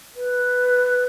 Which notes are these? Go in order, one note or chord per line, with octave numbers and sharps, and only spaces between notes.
B4